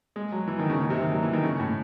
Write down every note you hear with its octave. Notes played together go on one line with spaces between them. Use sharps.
G#3
F#3
E3
D#3
C#3
D#3
C3
D#3
F#3
E3
D#3
C#3
A2